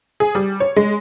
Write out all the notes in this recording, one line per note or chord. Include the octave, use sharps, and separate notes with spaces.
G#4
G3
C#5
G#3